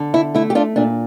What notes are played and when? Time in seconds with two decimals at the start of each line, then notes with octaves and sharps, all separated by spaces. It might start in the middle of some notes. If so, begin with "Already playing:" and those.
Already playing: D3
0.14 E4
0.35 A3 E4
0.50 G4
0.55 D4 F4
0.76 A#2 D4